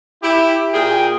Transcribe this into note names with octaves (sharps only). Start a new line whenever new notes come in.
E4 G4
A#2 G#4 G5